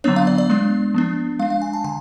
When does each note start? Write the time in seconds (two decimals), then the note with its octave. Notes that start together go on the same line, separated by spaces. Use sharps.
0.04 D3 F#3 B3 D4 C#5
0.16 F5
0.27 D5
0.38 D5
0.50 G#3 B3 D4
0.94 F3 B3 D4
1.39 G#3 F5
1.42 D4
1.50 F5
1.62 G#5
1.73 A5
1.84 D3 G#5